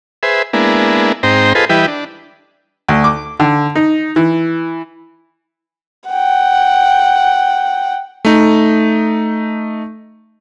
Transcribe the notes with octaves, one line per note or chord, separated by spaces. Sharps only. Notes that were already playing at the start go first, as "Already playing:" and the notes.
G#4 B4 C5 E5
G#3 A#3 B3 D4 E4
G#2 C4 D#4 C5 G5 A#5
F4 G#4 A4 B4 C5 D#5
E3 G3 E4 G4 B4 D#5
D4
D2
D6
D3
D#4
E3
F#5 G5
A3 D#4